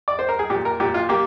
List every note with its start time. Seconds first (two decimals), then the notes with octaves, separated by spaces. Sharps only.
0.08 D5
0.19 C5
0.29 A#4
0.39 G#4
0.50 A#2 G4
0.65 A#4
0.80 A#2 G4
0.94 F4
1.09 A#3 G4